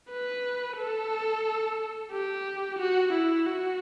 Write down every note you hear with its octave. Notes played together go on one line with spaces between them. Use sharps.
B4
A4
G4
F#4
E4
F#4